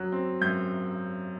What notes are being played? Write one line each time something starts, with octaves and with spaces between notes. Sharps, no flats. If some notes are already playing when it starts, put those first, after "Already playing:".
Already playing: F#2 F#3 F#6
C4
F#2 G6